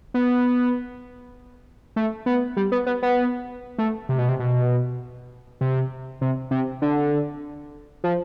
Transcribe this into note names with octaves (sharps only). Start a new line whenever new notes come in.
B3
A3
B3
G3
B3
B3
B3
A3
C3
B2
C3
B2
C3
C3
C3
D3
F3